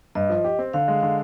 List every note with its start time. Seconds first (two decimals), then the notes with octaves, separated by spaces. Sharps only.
0.15 G2 D#5
0.30 F3
0.44 G4
0.59 C4
0.73 D3 F5
0.88 G#3
1.03 D3